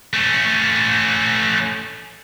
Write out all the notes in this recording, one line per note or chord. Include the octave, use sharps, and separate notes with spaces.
A3 C#4